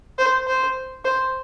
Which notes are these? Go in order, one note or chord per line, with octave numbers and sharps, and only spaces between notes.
C5
C5
C5